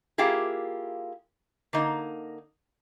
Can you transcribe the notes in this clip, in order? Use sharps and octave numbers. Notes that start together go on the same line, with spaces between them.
A#3 E4 F4 G4 G#4
D3 A#3 D#4